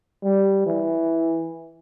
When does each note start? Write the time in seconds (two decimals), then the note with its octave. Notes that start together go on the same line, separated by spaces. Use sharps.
0.23 G3
0.66 E3